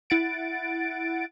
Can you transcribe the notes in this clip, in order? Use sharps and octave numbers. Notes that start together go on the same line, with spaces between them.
E4 F#5 A6 D7